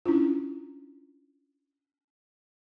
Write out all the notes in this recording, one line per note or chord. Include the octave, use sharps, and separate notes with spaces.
C#4 D4 E4 F4